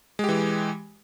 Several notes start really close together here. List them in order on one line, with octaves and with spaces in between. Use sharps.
G#3 G4 E3